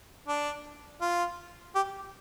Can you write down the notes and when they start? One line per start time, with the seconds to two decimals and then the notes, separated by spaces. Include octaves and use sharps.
0.28 D4
1.01 F4
1.75 G4